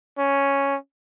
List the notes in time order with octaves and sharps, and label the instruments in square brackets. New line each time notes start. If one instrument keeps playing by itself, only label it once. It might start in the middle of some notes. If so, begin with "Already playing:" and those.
[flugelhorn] C#4